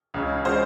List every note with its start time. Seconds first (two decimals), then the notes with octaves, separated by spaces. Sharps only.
0.14 C#2 C#3 G#3
0.45 C#3 G#3 C5